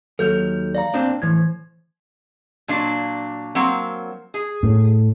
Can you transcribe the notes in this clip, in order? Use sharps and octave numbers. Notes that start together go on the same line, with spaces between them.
D#2 F#3 A4 G6 F7
D5 F5 A#5
A#2 C4 D4
A2 E3 G#6
A#2 F#3 D4
F#3 A#3 C4
G#4
A2